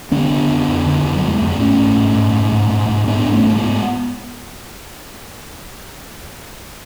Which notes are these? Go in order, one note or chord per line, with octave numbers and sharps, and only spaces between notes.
D3 B3 D4
D3
F2
F2
D3
F2
F#3
F2 G#3
F2 A3
B3
G#2 A3 C#4
G#2
G#2
G#2
G#2
G#2
G#2
G#2
G#2 B3 D4
G#2
A3 C#4
G#2
C#4
G#3 B3
G#2